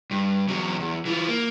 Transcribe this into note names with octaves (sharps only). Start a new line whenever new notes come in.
G2
E2 F#3
E2
E3 F4
A#3